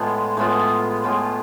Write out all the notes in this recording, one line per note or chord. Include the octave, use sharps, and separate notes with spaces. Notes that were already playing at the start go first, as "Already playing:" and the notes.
Already playing: A2 G#3 B3 F4
A2 G#3 B3 F4
A2 G#3 B3 F4